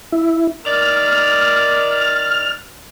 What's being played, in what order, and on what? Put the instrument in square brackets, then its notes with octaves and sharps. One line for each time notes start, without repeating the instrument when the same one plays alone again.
[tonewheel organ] E4
[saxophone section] D#3 D5 [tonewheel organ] F6